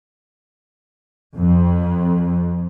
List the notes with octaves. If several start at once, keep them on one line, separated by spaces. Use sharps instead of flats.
F2